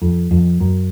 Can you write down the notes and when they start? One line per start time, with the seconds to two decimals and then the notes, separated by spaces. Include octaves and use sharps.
0.02 F2
0.31 F2
0.60 F#2